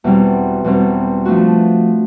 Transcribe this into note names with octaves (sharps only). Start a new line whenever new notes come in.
E2 B2 G3 C4
E2 B2 G3 C4
F3 A3 D4 F#4